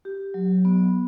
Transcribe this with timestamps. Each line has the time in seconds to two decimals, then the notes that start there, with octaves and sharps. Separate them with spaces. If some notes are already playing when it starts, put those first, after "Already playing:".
0.05 G4
0.34 F#3
0.65 B3